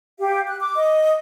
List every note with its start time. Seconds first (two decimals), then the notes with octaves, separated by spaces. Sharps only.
0.19 G4 F5
0.48 F#6
0.60 D6
0.75 D#5